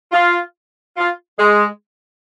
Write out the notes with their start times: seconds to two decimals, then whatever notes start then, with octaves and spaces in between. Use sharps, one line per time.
0.12 F4
0.97 F4
1.39 G#3